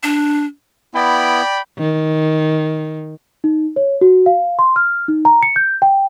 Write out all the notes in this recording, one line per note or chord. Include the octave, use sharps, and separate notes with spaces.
D4
B3 E4 D5 G5 B5
D#3
D#4
C#5
F#4
F5
C6
F6
D#4
A#5
C#7
G6
G5